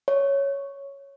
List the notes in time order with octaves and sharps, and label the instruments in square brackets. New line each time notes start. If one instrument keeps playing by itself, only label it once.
[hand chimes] C#5